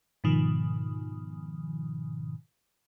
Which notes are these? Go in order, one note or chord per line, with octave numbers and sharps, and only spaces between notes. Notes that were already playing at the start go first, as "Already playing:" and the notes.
G#2 B2 D#3 F3